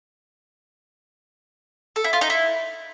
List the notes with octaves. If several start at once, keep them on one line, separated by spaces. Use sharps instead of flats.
A4
E4
F4
D#4
E4